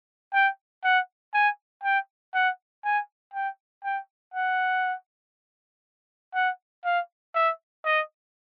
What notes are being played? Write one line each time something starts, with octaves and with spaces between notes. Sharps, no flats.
G5
F#5
G#5
G5
F#5
G#5
G5
G5
F#5
F#5
F5
E5
D#5